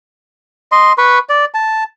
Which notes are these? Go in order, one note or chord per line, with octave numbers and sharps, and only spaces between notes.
D#5 C6
B4 B5 C#6
D5
A5